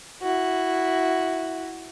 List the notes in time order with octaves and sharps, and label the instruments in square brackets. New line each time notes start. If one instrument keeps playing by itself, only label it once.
[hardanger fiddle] E4 F#4